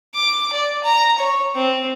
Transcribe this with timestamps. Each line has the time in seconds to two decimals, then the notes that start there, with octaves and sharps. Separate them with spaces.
0.14 D6
0.53 D5
0.83 A#5
1.18 C#5
1.55 C4